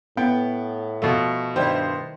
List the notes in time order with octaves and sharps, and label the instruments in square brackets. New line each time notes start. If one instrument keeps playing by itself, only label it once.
[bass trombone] A2 [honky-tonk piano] B3 [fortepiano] G5
[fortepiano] B2 A3 [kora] F3
[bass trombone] G2 [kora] D#3 G3 E4 [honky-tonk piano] C5